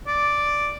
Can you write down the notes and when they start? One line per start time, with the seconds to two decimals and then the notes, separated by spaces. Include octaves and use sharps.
0.07 D5